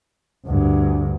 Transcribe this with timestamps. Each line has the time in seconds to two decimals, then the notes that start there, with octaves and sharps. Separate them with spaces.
0.46 D2 G2